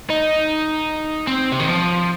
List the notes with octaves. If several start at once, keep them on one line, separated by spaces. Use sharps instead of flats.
D#4
C4
C3
D#3
F3